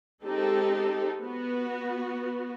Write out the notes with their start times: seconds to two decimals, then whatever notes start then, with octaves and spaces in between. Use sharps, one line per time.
0.22 G#3 C4 D#4 G4 A4
1.21 B3 F#4